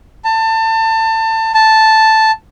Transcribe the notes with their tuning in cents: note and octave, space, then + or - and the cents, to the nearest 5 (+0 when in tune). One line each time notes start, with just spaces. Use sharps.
A5 +25
A5 +0